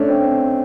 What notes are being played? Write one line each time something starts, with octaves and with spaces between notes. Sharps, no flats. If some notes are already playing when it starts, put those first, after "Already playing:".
Already playing: A3 C#4 D4
C4